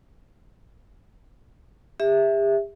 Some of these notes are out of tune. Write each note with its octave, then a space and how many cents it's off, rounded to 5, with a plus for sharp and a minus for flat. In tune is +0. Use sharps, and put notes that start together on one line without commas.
G4 +45 E5 +0